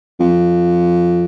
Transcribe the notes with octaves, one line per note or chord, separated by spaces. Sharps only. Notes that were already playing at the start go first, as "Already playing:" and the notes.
F2